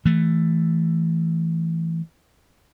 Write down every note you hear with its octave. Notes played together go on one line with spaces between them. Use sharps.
E3 A3